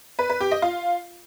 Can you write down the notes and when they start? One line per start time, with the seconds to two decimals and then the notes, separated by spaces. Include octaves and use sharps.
0.19 B4
0.30 B4
0.40 G4
0.51 D#5
0.62 F4